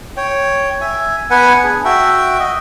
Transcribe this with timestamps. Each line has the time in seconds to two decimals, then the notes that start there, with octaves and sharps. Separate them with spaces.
0.17 C#5 G5
0.81 E5 G#5
1.30 B3 B4 F#5 G#5
1.64 D4 G#4
1.85 F#4 E5 G5
2.39 D#5